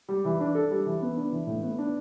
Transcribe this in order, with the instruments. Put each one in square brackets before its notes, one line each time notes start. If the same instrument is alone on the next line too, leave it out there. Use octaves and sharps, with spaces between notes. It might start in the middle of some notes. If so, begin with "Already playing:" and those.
[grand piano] G3
E3
D4
A4
G3
E3
B3
D4
E3
A2
B3
D4